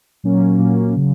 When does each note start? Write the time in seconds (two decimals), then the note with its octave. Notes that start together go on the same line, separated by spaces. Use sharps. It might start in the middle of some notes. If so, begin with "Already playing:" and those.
0.23 A#2 F#3 A#3 C#4
0.59 A#2 F#3 A#3 C#4
0.96 C#3 F#3